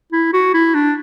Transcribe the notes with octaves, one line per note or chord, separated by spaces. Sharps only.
E4
F#4
E4
D4